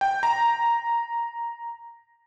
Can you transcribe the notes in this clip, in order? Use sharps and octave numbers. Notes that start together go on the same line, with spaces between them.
G5
A#5